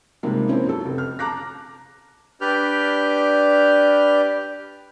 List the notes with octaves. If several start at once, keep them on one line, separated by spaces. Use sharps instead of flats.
C3 D#3 F3 G3 G#3 A#3
F3 A#3 C4 C#4 E4
F#2 A4
F1
F6
A5 A#5 D6 F#6 A#6
D4 G4 B4 D5 F6 G6